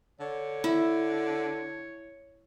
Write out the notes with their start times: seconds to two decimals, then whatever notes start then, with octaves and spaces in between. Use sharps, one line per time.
0.20 D3 C#5
0.64 E4